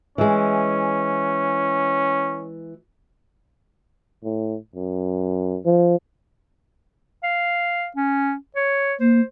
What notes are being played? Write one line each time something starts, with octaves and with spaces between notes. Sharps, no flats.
E3 G#3 C#4
A2
F#2
F3
F5
C#4
C#5
A#3 C5